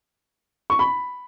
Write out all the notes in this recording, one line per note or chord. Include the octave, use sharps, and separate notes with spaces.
C#6
B5